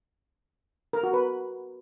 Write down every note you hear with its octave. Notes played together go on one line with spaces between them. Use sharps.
A#4
F#4
B4